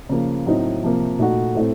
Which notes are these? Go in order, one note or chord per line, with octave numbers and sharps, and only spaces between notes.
C#3 F3 A#3
A2 F#3 C4 D#4
C3 F3 A#3
A#2 A3 D#4 F#4
A2 A3 C4